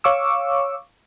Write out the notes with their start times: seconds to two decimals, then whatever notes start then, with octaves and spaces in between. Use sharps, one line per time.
0.04 C#5 F5 C#6 D6 E6